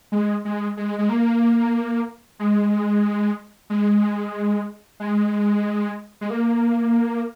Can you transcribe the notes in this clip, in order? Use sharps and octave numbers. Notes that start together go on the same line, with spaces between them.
G#3
G#3
G#3
G#3
A#3
G#3
G#3
G#3
G#3
A#3